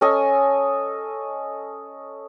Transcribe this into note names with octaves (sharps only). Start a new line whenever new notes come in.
C#4 A4 D#5 G#5